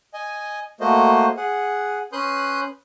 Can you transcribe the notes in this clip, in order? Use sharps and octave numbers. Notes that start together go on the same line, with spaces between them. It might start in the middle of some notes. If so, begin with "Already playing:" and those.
D#5 G#5
A3 A#3 F#4 C5 D#5
G#4 F#5
C#4 B4 C6 D#6 F#6 G6